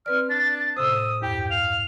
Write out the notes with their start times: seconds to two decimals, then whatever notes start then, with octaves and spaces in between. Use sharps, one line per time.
0.06 C4 B4 D5 F6
0.30 D4 A6
0.77 A2 C3 C5 D#6 E6
1.22 E2 G2 G4 G5
1.50 F5 F7